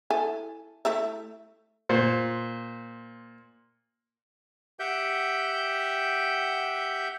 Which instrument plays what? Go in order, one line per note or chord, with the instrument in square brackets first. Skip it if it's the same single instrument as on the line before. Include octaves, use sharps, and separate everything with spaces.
[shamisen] E4 A4 G#5
A3 E4 E5
[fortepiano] A#2 C5
[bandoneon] G4 E5 F#5 G5 G6